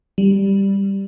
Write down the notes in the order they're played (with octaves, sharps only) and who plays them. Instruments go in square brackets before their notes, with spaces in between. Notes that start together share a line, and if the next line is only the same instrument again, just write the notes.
[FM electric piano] G3